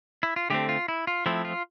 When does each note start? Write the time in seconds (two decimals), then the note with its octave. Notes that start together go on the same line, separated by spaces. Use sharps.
0.23 E4
0.36 F4
0.50 D3 A3 C4 G4
0.69 F4
0.88 E4
1.07 F4
1.26 F3 A3 C4 E4
1.45 F4